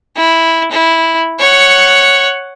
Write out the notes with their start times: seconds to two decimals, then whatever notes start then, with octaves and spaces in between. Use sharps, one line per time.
0.16 E4
0.71 E4
1.39 C#5 F#5